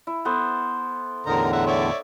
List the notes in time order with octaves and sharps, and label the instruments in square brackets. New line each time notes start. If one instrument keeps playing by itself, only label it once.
[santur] E4
B3 A4 C5
[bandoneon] E2 A2 D3 [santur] D#4 [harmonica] A#4 A#5
[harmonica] E5 F#5 A#5
C#5 D5 E5